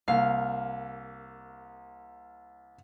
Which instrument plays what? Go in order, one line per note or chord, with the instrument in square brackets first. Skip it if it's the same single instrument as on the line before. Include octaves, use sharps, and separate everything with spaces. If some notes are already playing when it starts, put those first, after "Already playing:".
[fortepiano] C2 A#3 [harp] F5